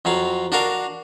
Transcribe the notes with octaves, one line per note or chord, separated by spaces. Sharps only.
F2 F#3 F5
D4 F#4 A#4 F5